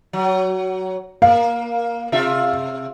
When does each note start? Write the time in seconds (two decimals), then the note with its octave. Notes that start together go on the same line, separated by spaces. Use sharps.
0.13 F#3
1.22 A#3 F5
2.12 C3 F4 E5